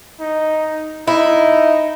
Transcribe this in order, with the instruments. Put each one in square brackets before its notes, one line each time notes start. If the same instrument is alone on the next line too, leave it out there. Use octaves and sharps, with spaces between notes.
[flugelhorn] D#4
[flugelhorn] D#4 [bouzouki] E4